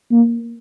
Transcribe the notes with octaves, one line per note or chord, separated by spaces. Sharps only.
A#3